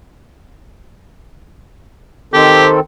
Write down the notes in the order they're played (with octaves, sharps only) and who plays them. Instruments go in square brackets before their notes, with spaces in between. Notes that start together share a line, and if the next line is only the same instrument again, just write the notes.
[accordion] D#3 C4 A4 [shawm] G4